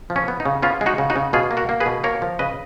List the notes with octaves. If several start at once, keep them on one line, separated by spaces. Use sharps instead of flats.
F3
C#4
B3
D#4
C#3
B3 C#4 F4
G#3
D#4 F#4
C#3
D#4 F#4
C#3
B2 F4 G#4
A#3
F#4 A#4
A#3
G#4 B4
B2
A#3 A#4 C#5
F3
C#3 B4 D#5